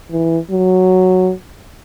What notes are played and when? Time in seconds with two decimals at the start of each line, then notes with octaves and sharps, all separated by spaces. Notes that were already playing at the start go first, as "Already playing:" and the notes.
0.11 E3
0.51 F#3